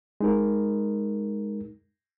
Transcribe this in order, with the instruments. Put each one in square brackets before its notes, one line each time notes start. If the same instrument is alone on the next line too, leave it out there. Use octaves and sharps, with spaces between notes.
[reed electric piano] G#3 D#4 A#4